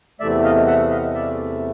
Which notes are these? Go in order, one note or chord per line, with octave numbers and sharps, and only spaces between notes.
E2 C3 E3 A3 D5 E5
D#5 F5
E5 F#5
D#5 F5
D5 E5